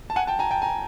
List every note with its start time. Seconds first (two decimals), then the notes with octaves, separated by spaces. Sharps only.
0.10 A5
0.16 F#5 G#5
0.27 G5 A5
0.39 G#5 A#5
0.51 G5 A5
0.62 G#5 A#5